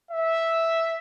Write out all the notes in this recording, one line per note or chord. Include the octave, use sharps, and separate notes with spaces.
E5